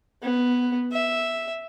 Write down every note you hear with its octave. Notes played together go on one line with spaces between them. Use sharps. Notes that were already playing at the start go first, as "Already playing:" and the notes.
B3
E5